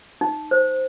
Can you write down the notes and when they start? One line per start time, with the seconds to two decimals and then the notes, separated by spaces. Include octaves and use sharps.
0.21 D#4
0.51 C5